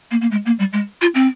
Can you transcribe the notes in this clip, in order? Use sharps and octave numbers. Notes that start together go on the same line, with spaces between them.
A#3
A#3
G#3
A#3
G3
G#3
F4
C4